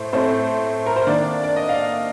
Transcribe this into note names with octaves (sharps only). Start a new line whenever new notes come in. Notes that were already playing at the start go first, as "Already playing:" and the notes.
Already playing: A2 C5
A2 A3 C4 C5
A#4
C5
D#3 A#3 D4 D5
D5
D#5
F5